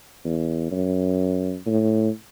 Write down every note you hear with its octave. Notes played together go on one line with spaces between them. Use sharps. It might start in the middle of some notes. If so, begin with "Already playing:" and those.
E2
F#2
A2